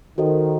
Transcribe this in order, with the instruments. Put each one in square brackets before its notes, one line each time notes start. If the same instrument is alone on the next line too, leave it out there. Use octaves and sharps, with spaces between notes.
[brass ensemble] D#3 [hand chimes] F#4 A4 C5 D#5